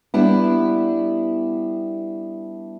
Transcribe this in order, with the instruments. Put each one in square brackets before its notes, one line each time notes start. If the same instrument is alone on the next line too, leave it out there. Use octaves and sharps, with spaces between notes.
[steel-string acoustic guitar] G3 B3 D4 E4